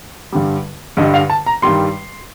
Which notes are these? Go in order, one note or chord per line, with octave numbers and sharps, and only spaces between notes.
G2 D3 G3
G2 D3 G3 D#5
F5
A5
A#5
G2 D#3 G3 C6